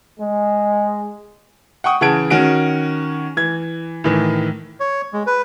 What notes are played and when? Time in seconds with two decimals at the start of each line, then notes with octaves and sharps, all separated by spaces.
0.20 G#3
1.84 F#5 G5 C#6 D#6
2.01 C#3 E3 F#5 A5 G#6 D7
2.30 D#3 C#4 F#4 D7
3.37 E3 G#6
4.04 A2 D#3 E3
4.80 C#5
5.13 G#3
5.27 B4